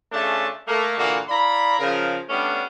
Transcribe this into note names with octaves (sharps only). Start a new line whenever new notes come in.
C#3 A3 C#4 D4 F4 A5
A3 A#3
A#2 D3 E3 A#3 F4 F#4
E4 D5 F5 A#5 B5
C#3 F3 A#4
G3 A3 B3 C#4 D4